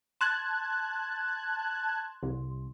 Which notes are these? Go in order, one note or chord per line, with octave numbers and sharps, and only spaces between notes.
A5 C6 F#6 G#6
C2